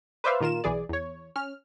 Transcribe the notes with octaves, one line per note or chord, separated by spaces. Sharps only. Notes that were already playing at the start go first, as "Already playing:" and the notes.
B4 C5 D5 E5 F5
A#2 D#3 F4 A#4 E7
B1 E3 G#4 D5
E2 C#5
C#4 F6